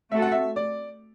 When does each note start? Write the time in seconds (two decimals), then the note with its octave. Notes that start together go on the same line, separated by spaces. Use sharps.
0.11 A3 C4 F#4 A4 E5
0.22 F#5
0.32 E5
0.56 D5